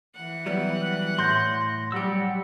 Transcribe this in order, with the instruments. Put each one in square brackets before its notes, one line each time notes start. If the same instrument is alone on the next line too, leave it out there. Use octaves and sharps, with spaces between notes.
[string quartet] E3 F#5
[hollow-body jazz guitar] F#3 G3 B3
[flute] F#6
[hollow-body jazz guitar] A2 [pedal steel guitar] C6 G6 [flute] A#6
[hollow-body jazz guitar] F#3 G4 [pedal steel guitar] G3 E6 [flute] F#5